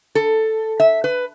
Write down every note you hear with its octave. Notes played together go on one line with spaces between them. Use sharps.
A4
E5
B4